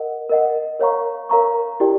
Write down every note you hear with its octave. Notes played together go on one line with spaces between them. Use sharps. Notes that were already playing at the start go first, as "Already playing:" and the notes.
Already playing: A#4 D#5 F#5
A#4 D#5 F#5
A#4 C#5 F5 A#5 C#6
A#4 C#5 F5 A#5 C#6
E4 G4 A#4 D5 G5